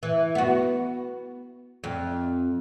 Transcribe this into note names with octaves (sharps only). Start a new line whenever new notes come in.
E3
B3 F#4
F2